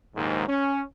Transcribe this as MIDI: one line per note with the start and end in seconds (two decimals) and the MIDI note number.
0.15 0.45 34
0.15 0.45 39
0.15 0.45 44
0.48 0.82 61